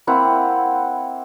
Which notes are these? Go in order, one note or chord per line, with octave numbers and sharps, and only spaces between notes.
A#3 C4 E4 F#5